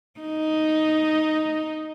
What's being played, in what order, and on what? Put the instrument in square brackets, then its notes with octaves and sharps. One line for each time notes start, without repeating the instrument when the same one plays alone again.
[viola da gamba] D#4